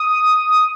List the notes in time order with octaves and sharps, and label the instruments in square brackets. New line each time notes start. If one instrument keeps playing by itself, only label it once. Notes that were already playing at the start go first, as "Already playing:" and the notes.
Already playing: [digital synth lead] D#6